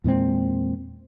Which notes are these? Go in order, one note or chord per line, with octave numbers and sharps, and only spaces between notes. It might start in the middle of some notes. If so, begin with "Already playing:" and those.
E2 A#2 G#3 C4